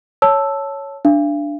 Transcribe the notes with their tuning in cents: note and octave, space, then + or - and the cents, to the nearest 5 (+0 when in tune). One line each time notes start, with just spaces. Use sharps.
C#5 +0 A5 +0 E6 +0
D4 +0 F5 -40